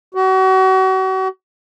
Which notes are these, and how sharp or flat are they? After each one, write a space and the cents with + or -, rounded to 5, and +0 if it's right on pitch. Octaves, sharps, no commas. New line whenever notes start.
F#4 +35